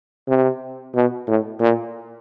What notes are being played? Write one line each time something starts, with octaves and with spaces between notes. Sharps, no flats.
C3
B2
A2
A#2